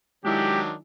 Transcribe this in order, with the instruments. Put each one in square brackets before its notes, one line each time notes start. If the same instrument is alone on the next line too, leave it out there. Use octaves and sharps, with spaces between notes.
[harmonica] D#3 F#3 D4 [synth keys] G#3 E4 [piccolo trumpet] G4